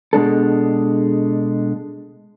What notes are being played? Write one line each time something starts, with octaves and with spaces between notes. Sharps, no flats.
B2 G#3 D4 A4